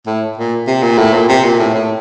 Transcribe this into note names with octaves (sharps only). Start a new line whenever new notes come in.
A2
A#2
C3
A#2
A2
A#2
C3
A#2
A2
A2